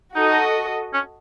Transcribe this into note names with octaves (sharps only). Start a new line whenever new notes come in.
D#4 F#4 A4 D#5
C#4